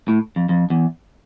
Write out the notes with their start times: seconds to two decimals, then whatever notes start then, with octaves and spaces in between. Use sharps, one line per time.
0.08 A2
0.36 F2
0.49 F2
0.70 E2